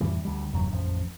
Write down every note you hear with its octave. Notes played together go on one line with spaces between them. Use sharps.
F2 A2 E3 G3
D2 G3
F1 E2 G2 F#3
A1 F2 F3